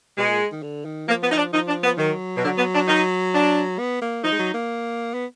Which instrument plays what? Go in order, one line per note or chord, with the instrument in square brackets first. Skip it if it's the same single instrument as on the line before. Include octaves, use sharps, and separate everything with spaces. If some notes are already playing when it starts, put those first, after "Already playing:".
[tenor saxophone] B2 [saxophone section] G#3
[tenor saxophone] A#2
D#3
D3
D#3
[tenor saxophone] F3 [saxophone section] A#3
[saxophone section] B3
D#4
D4
[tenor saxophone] F3 [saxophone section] D#4
[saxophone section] D4
B3
[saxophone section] D#3 [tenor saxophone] F#3
[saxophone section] B2
D3
B3
D4
D#4
D4
[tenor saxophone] B3
A#3
[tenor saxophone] F3 [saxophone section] D#4
[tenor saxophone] G#3
F#3
A#3
B3